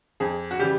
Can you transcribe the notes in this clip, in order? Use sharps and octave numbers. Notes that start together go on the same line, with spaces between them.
F2 G#4
F#4
C#3 E3 G3 G4